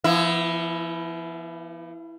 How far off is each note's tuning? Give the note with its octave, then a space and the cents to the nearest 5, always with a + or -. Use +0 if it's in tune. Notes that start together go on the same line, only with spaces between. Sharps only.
F3 -40 B3 -5 E4 +0